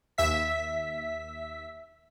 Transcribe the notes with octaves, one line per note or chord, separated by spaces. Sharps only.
D#2 E5 B6